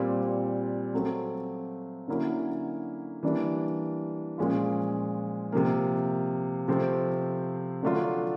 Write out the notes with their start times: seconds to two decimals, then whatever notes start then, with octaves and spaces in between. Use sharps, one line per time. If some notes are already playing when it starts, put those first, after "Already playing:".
Already playing: A#2 G3 C4
0.94 F#3 A3 C4
2.08 D3 F#3 A#3 C#4 E4
3.23 E3 G3 A#3 D4
4.38 A#2 F3 G#3 C#4 F4
5.52 C3 F3 A#3
6.68 C3 F3 A3 C4
7.83 D3 F#3 A3 D4 F4